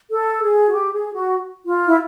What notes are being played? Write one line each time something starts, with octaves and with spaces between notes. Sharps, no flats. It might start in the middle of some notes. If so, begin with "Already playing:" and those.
A4
G#4
F#4
G4
G#4
F#4
F4
E4